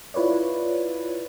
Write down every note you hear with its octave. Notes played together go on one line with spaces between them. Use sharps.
E4 F4 B4 C#5 D5